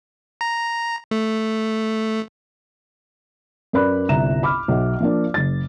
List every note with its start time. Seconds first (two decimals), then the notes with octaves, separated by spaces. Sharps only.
0.41 A#5
1.11 A3
3.73 F#2 A#4 B4 D5 B5 F#6
4.09 G1 C2 E5 A#5 E7
4.43 B5 D6 F6
4.68 B1 E5
5.00 F3 A#3 D4
5.34 F#1 A6